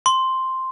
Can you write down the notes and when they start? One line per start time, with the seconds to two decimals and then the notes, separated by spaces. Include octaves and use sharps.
0.06 C6